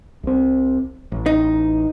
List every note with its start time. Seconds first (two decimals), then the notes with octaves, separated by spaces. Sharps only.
0.23 C2 C4
1.12 A1
1.26 D#4